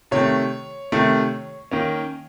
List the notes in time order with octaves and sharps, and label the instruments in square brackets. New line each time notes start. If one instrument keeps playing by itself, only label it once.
[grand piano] C3 D#3 A3 C#5
C3 D#3 A3
D#3 A#3 C#4